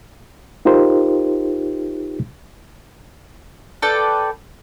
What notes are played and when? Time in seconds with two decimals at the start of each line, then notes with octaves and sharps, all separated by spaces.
0.65 D#4 F4 G4 A#4 C5
3.82 A4 B4 D5 G5